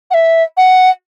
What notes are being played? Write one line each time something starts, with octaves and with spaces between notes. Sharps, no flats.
F#5
E5
F#5